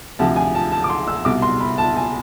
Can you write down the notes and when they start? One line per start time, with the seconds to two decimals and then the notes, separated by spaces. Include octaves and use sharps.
0.19 D2 C3 F3 A5
0.36 G#5
0.55 A5
0.72 A5
0.84 D6
0.90 C6
1.07 E6
1.25 C2 B2 D6
1.42 C6
1.60 B5
1.78 A5
1.96 G#5